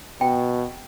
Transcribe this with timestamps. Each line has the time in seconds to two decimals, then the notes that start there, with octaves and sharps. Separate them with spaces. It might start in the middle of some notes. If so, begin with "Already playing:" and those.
0.21 B2 G5